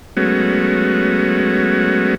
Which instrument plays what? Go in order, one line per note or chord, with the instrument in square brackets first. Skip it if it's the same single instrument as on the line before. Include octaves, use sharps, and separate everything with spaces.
[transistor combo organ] F#3 G#3 A3 B3 C#4 F#4